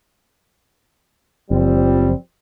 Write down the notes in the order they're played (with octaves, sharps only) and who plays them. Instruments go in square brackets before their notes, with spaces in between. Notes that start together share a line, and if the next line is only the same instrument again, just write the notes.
[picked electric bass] F#1 [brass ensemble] F3 G3 C4